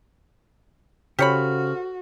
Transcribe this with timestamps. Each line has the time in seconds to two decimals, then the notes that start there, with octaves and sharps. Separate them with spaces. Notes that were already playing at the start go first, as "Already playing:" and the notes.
1.19 C#3 F#4 G4 A4 C5 C#5 B5 F6